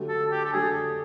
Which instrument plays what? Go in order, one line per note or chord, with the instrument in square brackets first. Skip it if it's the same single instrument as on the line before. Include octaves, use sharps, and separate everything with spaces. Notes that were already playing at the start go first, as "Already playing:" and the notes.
Already playing: [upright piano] D3 F#3 A3 D4 G4
[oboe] A4
G4
A4
[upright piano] D3 F#3 A3 D4 G4 [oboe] G#4